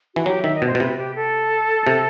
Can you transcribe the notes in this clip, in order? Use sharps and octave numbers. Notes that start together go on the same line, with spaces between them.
E3 F#4
F#3 G4
D#3 E5
D#5
B2
C5
B2
C3 B4
G4
A4
C3